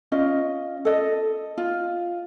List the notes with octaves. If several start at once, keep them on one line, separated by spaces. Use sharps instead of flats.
C#4 F4 D#5
A4 D#5
F4